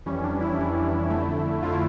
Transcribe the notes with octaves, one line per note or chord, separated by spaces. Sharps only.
F2 E3 G3 C#4
D4
E4
F2 E3 G3
F2 D3 A3
F2 D3 A3 F4
E4